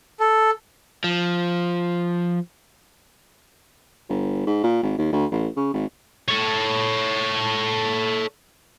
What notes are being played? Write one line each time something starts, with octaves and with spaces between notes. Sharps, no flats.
A4
F3
G1
G#2
A#2
G#1
D#2
D2
A1
C#3
G#1
A4 C#5